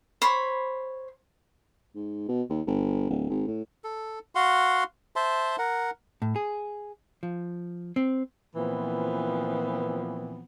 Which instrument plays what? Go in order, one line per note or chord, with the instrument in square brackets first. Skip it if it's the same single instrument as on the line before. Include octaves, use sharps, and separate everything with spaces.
[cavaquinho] C5 C#5 B5
[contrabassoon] G#2
B2
D#2
G1
D1
G#1
A2
[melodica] A4
F#4 F5 F#5 C6
C5 E5 A5 C6
A#4 F#5
[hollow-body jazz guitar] A2
G#4
F3
C4
[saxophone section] A#2 E3 F3 B3 C4